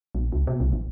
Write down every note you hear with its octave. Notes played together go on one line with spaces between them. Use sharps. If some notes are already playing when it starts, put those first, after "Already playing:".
A#1
C#2
B2
C2
A1